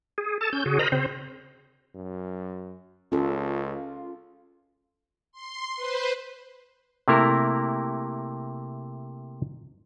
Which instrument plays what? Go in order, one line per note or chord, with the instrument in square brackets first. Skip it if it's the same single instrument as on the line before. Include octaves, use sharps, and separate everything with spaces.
[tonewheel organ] G#4
A4 A5
C#4 G6
C#3 F#4 G#4
A#4 C5 D#5 A#5 B5
C#3 C4 C5
[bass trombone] F#2
[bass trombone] C#2 [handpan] C#4 A4 [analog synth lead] F4
[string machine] C6
B4 C5
[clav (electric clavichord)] C3 A3 A#3 E4 A#4